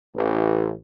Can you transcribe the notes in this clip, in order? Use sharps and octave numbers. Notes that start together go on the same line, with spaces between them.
A1